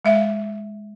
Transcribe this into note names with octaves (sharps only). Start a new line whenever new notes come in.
G#3 E5 F5